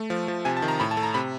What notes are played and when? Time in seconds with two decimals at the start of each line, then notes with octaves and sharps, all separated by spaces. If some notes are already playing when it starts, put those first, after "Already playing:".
Already playing: A3
0.10 F3
0.28 F3
0.45 C3 G#5
0.57 A5
0.62 D#3
0.68 A#5
0.80 A2 B5
0.91 A5
0.97 A3
1.03 A#5
1.14 C3 B5